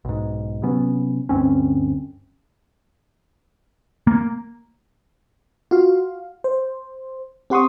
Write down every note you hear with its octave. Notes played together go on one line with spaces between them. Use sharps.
B1 G#2
C3 F#3 B3 C#4
D2 G2 C4 C#4
A#3
F4 F#4 F5
C5
C4 G4 F#5 C6 C#6 D#6